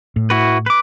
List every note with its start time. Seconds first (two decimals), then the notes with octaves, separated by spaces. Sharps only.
0.16 A2
0.30 E4 F#4 B4
0.66 B4 D6